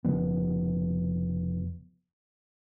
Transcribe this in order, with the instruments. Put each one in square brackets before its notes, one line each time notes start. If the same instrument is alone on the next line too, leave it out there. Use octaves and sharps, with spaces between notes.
[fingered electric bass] F1 C#3 F3 B3